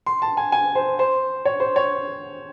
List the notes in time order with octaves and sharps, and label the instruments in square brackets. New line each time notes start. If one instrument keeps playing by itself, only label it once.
[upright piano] C6
A5
G#5
G#5
C5
C5
C#5
C5
C#5